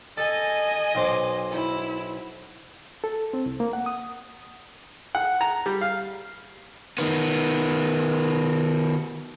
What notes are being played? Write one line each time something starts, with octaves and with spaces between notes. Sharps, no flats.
A4 D#5 G#5
B1 C5 D6
E4
A4
C4
C2
A#3
F#5
D#6
F#5
A#5
G3
F5
D#3 B3